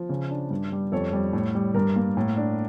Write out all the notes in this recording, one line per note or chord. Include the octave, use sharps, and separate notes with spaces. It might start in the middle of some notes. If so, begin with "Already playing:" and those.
Already playing: F3
C#3
D4
G2
G3
F2 A4 C#5
G3
A2
G3
G2 A#4
A#3
A2
D4